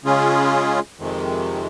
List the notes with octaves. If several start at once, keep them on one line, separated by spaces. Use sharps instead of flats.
C#3 G#3 C#4 F4 G#4
F2 C3 D#3 G#3